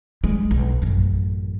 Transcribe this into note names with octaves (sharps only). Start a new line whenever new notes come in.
G3 G#3
B1
A1 F#2